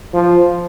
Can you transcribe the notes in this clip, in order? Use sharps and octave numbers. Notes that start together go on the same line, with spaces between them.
F3